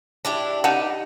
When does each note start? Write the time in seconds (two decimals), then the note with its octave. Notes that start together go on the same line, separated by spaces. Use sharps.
0.25 D4 E4 G4
0.64 D#4 G4 F#5 A5